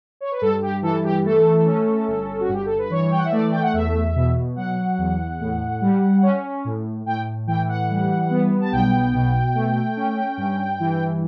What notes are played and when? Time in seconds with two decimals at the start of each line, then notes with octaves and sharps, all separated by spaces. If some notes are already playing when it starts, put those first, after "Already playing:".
0.21 C#5
0.32 B4
0.41 G2 A4
0.62 G4
0.82 E3 A4
1.04 G4
1.25 A3 A4
1.66 C#4
2.08 G1
2.40 F#4
2.49 G2 G4
2.65 A4
2.78 B4
2.90 E3 C#5
3.11 G5
3.18 F#5
3.25 E5
3.32 A3 D5
3.51 G5
3.62 F#5
3.73 E2 E5
4.15 B2
4.56 F#3 F#5
4.98 E2
5.40 A2
5.81 G3
6.22 C#4
6.65 A2
7.06 A2 G5
7.47 E3 G5
7.68 F#5
7.89 G3
8.30 B3
8.61 A5
8.72 B1 G5
9.14 B2
9.54 A3
9.97 C#4
10.37 G2
10.80 E3